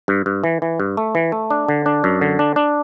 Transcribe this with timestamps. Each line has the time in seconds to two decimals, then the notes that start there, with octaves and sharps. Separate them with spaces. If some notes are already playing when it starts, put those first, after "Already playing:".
0.08 G2
0.26 G2
0.44 E3
0.62 E3
0.80 G2
0.97 A3
1.15 E3
1.32 A3
1.50 D4
1.68 D3
1.86 D4
2.04 F#2
2.21 D3
2.39 D4
2.56 D4